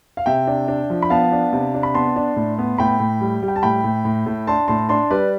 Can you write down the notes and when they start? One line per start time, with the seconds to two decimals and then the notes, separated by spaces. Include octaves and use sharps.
0.17 F5
0.26 C3 E5 G5
0.47 D4
0.68 D4
0.90 F3
1.02 B5
1.10 B3 F5 A5
1.32 D4
1.53 C3
1.74 D4
1.83 B5
1.94 B3 A5 C6
2.16 D4
2.36 A2
2.59 B3
2.78 A2 G5 B5
3.00 A2
3.21 G3
3.43 G3
3.48 G5
3.56 A5
3.63 A2 G5 B5
3.84 A2
4.05 A2
4.26 A2
4.47 D4 A5 C6
4.68 A2 A5 C6
4.89 D4 A5 C6
5.11 G3 B4 D5